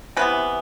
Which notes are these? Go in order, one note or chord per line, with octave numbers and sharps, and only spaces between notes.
C3 E3 B3 B4